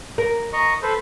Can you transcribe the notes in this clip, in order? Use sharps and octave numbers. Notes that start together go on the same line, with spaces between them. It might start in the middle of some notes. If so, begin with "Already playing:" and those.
A#4
D#5 A#5 C#6
A4 B4 C5